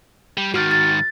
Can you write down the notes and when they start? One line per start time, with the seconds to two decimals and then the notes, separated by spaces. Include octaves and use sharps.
0.37 G3
0.54 G#2 D#3 F#4 F6 A6
0.71 A6